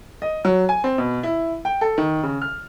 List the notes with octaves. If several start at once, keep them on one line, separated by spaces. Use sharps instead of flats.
D#5
F#3
G#5
C4
B2
E4
G5
A4
D#3
C#3
F6